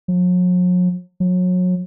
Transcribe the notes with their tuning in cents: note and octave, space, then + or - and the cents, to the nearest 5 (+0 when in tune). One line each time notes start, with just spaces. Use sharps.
F#3 -45
F#3 -30